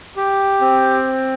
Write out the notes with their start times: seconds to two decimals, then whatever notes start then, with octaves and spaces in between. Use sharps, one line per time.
0.17 G4
0.61 C4